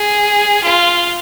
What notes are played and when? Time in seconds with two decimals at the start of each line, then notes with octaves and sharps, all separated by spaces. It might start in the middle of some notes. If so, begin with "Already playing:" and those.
Already playing: G#4
0.63 F4